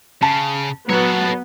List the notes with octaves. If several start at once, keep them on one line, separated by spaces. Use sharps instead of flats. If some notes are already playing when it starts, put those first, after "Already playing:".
C#3 A5
F#3 B3 A4 C#5